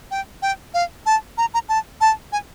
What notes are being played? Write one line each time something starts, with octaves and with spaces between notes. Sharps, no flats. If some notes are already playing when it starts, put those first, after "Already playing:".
G5
G5
F5
A5
A#5
A#5
A5
A5
G#5